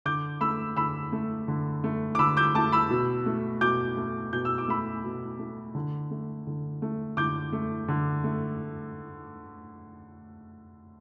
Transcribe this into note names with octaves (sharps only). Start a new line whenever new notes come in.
D3 D6 G6
A3 B5 E6
D3 B5 E6
A3
D3
A3
D6
D3 B5 E6
D6 G6
A3 A5 D6
B5 E6
B2
A3
B2 D6 G6
A3
B2 G6
E6
D6
A3 B5 E6
B2
A3
D3
A3
D3
A3
D3 D6 G6
A3
D3
A3